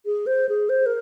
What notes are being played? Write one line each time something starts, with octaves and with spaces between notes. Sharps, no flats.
G#4
C5
G#4
C5
A#4